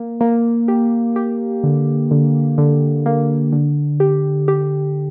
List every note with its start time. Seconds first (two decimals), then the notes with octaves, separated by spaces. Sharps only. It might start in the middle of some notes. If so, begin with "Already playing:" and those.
Already playing: A#3
0.21 A#3
0.68 G4
1.16 G4
1.63 D3
2.11 D3
2.58 D3
3.06 A#3
3.53 D3
4.00 G4
4.48 G4